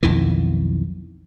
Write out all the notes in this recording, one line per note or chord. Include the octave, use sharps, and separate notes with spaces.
B1 F2 D#3 E3